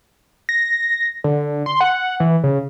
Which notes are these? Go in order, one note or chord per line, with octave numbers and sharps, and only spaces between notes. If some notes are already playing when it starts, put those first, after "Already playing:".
A#6
D3
C6
F#5
E3
C#3